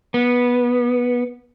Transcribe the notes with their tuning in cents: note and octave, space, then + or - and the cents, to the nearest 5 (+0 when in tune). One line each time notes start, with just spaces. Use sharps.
B3 -15